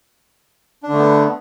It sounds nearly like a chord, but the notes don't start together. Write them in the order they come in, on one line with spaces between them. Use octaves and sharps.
D4 D3 A3 B3